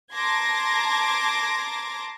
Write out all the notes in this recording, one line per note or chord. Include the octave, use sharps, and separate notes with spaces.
A5 A#5 C6 D6 G#6 A#6